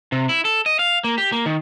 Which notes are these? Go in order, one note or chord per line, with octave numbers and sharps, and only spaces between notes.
C3
E4
A4
D#5
F5
A#3
G4
A#3
D#3